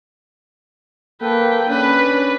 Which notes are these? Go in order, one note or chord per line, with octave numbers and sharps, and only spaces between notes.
A#3 A4 B4 G5
C#4 D4 B4